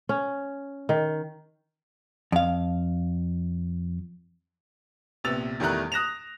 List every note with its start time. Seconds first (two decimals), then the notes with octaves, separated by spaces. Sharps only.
0.09 C#4
0.89 D#3
2.32 F2 F5
5.24 A#1 C3 B3 E6 A6 F7
5.60 E2 D#3 G3 A3 A#5 F#6
5.92 D#6 F#6 A#6 E7 F7